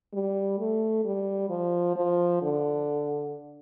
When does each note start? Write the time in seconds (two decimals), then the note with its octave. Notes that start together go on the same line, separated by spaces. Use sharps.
0.13 G3
0.59 A3
1.04 G3
1.50 F3
1.96 F3
2.42 D3